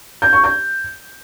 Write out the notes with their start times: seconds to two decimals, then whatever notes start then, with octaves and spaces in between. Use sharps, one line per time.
0.22 G6
0.33 C#6
0.44 G6